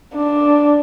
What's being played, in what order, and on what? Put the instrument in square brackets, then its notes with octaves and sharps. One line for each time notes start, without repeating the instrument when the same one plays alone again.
[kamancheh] D4